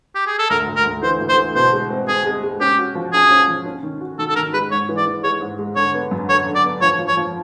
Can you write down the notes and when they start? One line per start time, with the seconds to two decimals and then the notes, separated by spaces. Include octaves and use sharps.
0.15 G4
0.27 G#4
0.39 A4
0.50 D2 A#4
0.67 D2
0.76 A#4
0.85 D2
1.02 E3 C5
1.20 D2
1.29 C5
1.38 E3
1.55 B2 C5
1.73 G#3
1.90 C4
2.08 C4 G#4
2.26 G#3
2.43 G#3
2.61 C#4 G4
2.79 F#4
2.95 F3
3.13 C#4 G#4
3.31 C#4
3.48 F3
3.66 C#4
3.83 D#3
4.01 F#4
4.19 D#3 A4
4.29 A4
4.36 D#3 A#4
4.53 G#3 B4
4.71 G#2 C#5
4.89 E3
4.97 D5
5.06 E3
5.24 G#3 C#5
5.41 G#2
5.59 G#3
5.76 D3 C#5
5.94 B3
6.11 F#2
6.29 D3 C#5
6.46 D3
6.55 D5
6.64 B3
6.81 F3 C#5
6.99 F3
7.08 C#5
7.17 F3